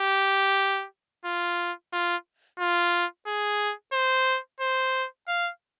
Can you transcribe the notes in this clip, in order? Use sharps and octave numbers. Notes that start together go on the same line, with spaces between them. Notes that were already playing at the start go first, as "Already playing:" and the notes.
Already playing: G4
F4
F4
F4
G#4
C5
C5
F5